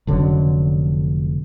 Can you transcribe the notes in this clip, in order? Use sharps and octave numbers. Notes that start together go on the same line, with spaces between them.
F1 D3 F#3 C#4